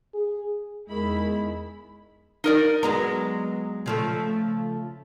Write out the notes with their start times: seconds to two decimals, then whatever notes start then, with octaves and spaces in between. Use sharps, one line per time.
0.14 G#4
0.89 E2 D#3 G#3 E4 B5
2.44 D#4 A#4 D5
2.83 F#3 G#3 B3 A#5
3.86 C#3 F3 A3